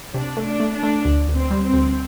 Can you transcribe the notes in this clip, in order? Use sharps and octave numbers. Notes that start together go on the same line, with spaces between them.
C3 D4
A3
D4
A3
D4
A3
D2
D2
C4
G3
C4
D2